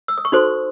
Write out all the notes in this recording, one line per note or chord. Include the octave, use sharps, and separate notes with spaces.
E6
D#6
C#6
D#4 F#4 A4 C5 C6